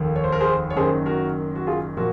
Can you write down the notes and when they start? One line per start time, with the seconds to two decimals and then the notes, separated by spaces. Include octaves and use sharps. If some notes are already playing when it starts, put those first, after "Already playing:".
Already playing: F1 D#2 D#3
0.16 C#5
0.24 C5
0.32 A#4
0.41 G#4 C5
0.70 C#5
0.76 F#1 F#2 D#3 G#4 C5
1.06 F#4 A#4
1.55 F#4
1.67 F4 G#4
1.97 A#2 F3 F#4 A#4